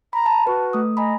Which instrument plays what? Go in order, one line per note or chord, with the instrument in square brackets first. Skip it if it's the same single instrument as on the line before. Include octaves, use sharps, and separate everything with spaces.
[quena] A#5 [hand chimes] B5
[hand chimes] A5
[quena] F#4 [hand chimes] B4
[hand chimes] A3 D#6
[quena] D#5 [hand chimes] G#5 A#5 B5